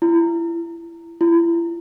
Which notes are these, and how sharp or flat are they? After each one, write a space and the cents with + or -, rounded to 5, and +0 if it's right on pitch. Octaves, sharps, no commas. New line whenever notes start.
E4 +30
E4 +35